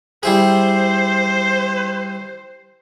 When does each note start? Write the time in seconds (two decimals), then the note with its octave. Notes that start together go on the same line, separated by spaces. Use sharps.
0.23 G3 E4 G#4 C5